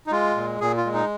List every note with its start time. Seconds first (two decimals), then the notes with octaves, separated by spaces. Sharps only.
0.07 D#4
0.11 G#3 F4
0.36 A#2
0.61 A#2 G#4
0.77 F4
0.85 G#3
0.94 D#4